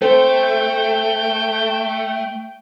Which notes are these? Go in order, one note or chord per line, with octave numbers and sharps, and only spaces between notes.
A3 A4 C5 G5